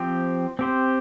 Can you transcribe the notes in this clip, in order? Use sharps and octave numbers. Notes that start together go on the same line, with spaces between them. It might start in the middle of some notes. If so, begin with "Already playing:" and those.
Already playing: F3 C4 G4
C4 G4 C5